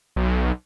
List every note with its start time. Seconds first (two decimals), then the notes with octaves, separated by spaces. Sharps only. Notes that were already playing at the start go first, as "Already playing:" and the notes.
0.16 B1